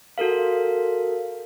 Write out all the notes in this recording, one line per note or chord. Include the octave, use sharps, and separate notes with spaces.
F#4 A4 A#4 F5